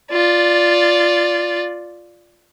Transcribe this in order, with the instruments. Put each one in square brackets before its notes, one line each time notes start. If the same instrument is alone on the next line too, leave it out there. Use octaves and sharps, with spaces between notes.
[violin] F4 D5